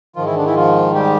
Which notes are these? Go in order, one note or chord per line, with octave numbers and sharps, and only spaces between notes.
G#2 D#3 F3 F4
E3 E4
D3 D4
E3 E4
F3 F4
G3 G4